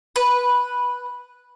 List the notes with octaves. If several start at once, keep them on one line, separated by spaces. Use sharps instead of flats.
B4